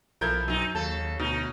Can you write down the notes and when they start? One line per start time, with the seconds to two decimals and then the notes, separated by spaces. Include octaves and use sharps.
0.21 B1 F3 E4 A4 A#4 G6 G#6
0.48 F#2 B2 F#3 D#4
0.75 D#2 C#3 A4 A5
1.19 D2 B2 D#4